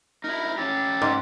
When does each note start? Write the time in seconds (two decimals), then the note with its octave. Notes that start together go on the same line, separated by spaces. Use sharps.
0.24 D#4 E4 A#4
0.58 C#4 G4 A4
1.02 G#2